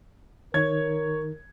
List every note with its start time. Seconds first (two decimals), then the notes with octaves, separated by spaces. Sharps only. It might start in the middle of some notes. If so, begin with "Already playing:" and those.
0.54 D#3 D#4 A#4 C#5 G#6